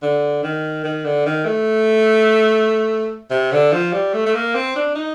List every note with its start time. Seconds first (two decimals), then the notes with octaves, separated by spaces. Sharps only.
0.02 D3
0.43 D#3
0.84 D#3
1.05 D3
1.26 D#3
1.45 A3
3.30 C3
3.52 D3
3.72 F3
3.93 G3
4.13 A3
4.26 A3
4.34 A#3
4.55 C4
4.76 D4
4.95 D#4